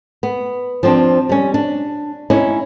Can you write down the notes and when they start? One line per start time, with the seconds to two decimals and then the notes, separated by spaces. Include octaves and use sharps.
0.23 B3
0.83 F3 C4 D4
1.29 G3 C#4
1.54 D4
2.30 C#4 D#4 E4